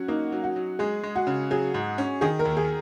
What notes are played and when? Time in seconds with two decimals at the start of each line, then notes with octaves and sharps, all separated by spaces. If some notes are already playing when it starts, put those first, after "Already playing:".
Already playing: F#3 C#4 F#4
0.08 A#3 D#4
0.32 F#3
0.44 F#4
0.56 F#3
0.79 G#3 G#4
1.03 G#3
1.16 F#4
1.27 C#3
1.51 F#3 G#4
1.74 G#2
1.98 C#4
2.21 D#3 G#4
2.39 A#4
2.45 D#2
2.57 G#4